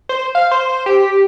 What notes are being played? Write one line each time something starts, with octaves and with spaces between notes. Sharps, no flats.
C5
F5
C5
G4